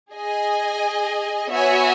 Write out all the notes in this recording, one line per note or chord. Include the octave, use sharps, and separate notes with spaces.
G#4 D#5 G#5
B3 F#4 C#5 E5 G#5